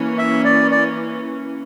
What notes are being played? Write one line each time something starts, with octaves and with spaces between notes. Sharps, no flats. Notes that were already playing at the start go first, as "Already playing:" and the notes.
Already playing: E3 A#3 C#4
E5
D5
D5